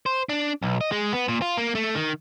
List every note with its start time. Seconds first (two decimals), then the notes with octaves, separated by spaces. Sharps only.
0.06 C5
0.29 D4
0.62 B1
0.81 D#5
0.92 G#3
1.13 B3
1.28 A#2
1.42 F4
1.57 A#3
1.75 A3
1.95 D#3